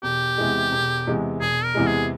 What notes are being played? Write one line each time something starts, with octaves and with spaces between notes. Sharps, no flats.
E1 G4
E2 C3 E3 G#3
E1
E2 C3 E3 G#3
E1 G#4
A#4
E2 C3 E3 G#3
G#4